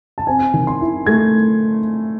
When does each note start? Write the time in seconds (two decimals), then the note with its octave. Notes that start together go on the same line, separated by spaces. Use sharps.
0.18 A5
0.27 C4 G#5
0.54 D#3
0.67 C6
0.81 E4
1.06 A3 G#6